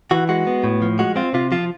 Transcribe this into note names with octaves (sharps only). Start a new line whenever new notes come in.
E3 F#4
G#3 F#4
B3
A2
F3
G#3 F#4
C4 F4
C3 F4
F3 F4